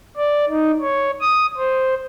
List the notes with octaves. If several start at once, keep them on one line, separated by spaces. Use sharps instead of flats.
D5
D#4
C#5
D#6
C5